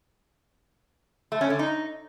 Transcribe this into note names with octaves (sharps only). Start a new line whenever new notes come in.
A3
C#4
D3
D#4